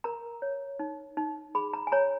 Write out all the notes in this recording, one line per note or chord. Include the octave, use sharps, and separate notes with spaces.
A#4 A#5
C#5
D#4
D#4
G#4 B5
A#5
G#5
C#5 A#5